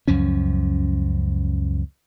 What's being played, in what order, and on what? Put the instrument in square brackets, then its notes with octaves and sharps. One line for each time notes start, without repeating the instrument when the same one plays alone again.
[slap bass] C#2 F#2 F3 C#4